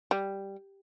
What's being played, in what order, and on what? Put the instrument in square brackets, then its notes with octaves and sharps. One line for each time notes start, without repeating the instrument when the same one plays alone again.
[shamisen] G3